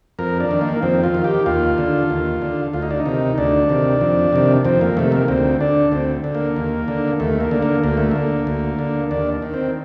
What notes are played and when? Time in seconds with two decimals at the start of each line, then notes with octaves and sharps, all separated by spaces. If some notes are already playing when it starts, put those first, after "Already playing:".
0.19 F2 A#4
0.40 D4
0.51 D#3
0.61 A#3
0.82 F2 C4
1.03 F4
1.14 D#3
1.24 G4
1.46 D#2 F4
1.78 D3
2.10 D#2
2.42 D3
2.73 D2 F4
2.82 D#4
2.91 D4
3.00 D#4
3.06 C3 D#3
3.38 D2 D4
3.69 C3 D#3
4.01 F2
4.33 C3 D#3
4.65 F2 C4
4.81 A#3
4.97 C3 D#3 A3
5.12 A#3
5.28 D2 C4
5.60 D3 D4
5.92 D2 C4
6.24 D3
6.35 A#3
6.56 D#2
6.88 D3
7.20 D#2 A3
7.40 A#3
7.51 D3
7.62 A#3
7.83 D2 A#3
7.97 A3
8.11 D3 A#3
8.47 D2
8.79 D3
9.11 D#2 D4
9.42 D#3
9.54 C4